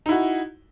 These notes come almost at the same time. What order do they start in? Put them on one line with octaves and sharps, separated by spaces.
D#4 E4 F#4